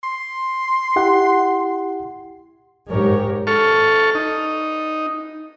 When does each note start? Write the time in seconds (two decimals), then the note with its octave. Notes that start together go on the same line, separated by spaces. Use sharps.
0.03 C6
0.96 E4 G4 F#5
2.88 G#2 G4 A#4 C#5
3.47 A4 C#6 F6
4.15 D#4